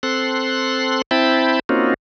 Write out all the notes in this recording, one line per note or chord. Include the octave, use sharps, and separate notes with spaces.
C4 A4 C6 F#6
C4 E4 G5 A5 B5
A#3 C4 C#4 D#4 F4 F#4